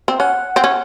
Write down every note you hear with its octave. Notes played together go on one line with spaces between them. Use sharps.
C4
C#4 F#5
C4
C#4